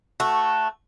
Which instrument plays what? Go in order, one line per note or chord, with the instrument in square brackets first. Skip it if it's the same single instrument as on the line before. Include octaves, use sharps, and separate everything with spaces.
[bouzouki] A3 F#4